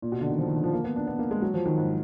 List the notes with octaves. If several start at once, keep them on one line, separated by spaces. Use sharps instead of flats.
A#2
B2
D3
D#3
F3
D#3
D3
F3
A#3
B3
D4
B3
A#3
G#3
F#3
F3
D#3
G#2